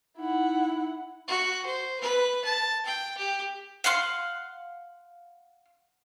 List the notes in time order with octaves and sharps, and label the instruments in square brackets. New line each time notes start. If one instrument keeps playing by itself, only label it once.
[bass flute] D#4 [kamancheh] E4 F#5
[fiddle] F#4
C5
B4
A5
G5
G4
[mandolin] F5 F#5 C6 F6